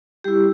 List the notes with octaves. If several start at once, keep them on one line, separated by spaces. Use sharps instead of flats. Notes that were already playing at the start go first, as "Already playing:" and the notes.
G3 E4 G4